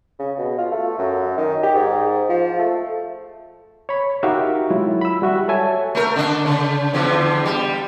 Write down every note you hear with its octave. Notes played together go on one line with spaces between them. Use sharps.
C#3
B2
F4
A3
F#2
D#3
G4
G#2
F3
A3
C#5 B5
D#4 F#4 G4 A#4 E5 F5
F#3 G#3 E4 F4
B5 E6
G3 F#4 E5
A4 C#5 E5 G#5 A5
A3 A#4
D3 D4
C#3
E2 D3 F3
G3